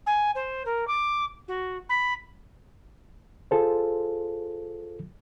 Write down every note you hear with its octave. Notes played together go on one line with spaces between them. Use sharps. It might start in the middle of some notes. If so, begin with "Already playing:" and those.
G#5
C5
A#4
D6
F#4
B5
F4 G#4 A4 C5